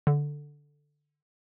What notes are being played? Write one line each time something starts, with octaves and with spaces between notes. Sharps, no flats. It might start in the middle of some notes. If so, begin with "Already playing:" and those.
D3